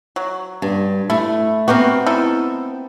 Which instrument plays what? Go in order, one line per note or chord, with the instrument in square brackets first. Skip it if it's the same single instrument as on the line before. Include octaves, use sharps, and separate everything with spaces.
[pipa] F#3
[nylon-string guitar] G2
[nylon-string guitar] A3 [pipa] E4
[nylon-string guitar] B3 C4 [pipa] F#4 G4 A#4
[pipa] D#4 E4 A4